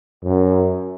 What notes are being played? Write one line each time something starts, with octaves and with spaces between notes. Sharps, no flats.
F#2